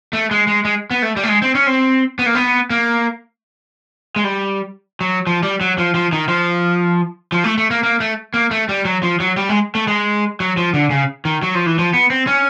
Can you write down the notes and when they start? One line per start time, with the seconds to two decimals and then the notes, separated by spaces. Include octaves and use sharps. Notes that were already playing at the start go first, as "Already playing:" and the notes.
0.13 A3
0.31 G#3
0.47 G#3
0.65 G#3
0.91 B3
1.02 A3
1.16 G3
1.23 A3
1.29 G#3
1.42 C4
1.55 C#4
1.67 C4
2.19 B3
2.26 A#3
2.35 B3
2.70 A#3
4.16 G#3
4.24 G3
5.01 F#3
5.27 F3
5.43 G3
5.61 F#3
5.78 F3
5.94 F3
6.13 D#3
6.28 F3
7.32 F3
7.44 A3
7.58 A3
7.71 A#3
7.83 A#3
8.00 A3
8.34 A#3
8.51 A3
8.69 G3
8.85 F#3
9.03 F3
9.20 F#3
9.37 G3
9.49 G#3
9.75 A3
9.88 G#3
10.40 F#3
10.57 F3
10.74 D3
10.91 C#3
11.25 D#3
11.42 F#3
11.55 F3
11.66 E3
11.79 F3
11.94 B3
12.10 C4
12.27 C#4